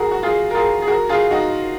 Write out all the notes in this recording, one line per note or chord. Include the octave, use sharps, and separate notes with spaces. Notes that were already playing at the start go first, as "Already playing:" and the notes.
Already playing: F#4 G#4 A#4
F#4
F4 G#4
A#4
F4 G#4
G#4
F#4 A#4
F4 G#4
D#4 F#4